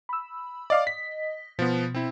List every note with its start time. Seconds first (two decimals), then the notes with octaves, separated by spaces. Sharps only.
0.09 B5 E6
0.70 D5 D#5 F5 D6
0.87 B6
1.59 B2 F3 B3
1.94 C4 E4